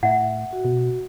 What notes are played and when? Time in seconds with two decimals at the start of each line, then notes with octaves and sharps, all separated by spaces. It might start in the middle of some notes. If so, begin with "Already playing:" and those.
0.03 A2 E5 F#5
0.53 F#4
0.65 B2